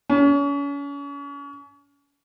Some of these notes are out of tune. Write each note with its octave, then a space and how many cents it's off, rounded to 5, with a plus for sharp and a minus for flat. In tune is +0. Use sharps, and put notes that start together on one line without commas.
C#4 +35